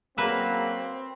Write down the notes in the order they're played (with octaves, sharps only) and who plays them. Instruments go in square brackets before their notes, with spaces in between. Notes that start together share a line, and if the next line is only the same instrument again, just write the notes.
[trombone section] F#3 A#3 [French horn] C4 [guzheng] B4 E5